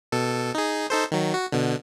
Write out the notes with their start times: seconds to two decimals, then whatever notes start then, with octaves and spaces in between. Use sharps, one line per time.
0.12 B2 A4
0.55 D#4 G#4
0.90 D#4 A4 C5
1.12 D#3 F#3
1.34 F#4
1.52 B2 D3